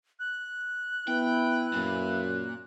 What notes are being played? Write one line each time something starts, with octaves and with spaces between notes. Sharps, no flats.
F#6
B3 E4 B4 G5
F#2 A#2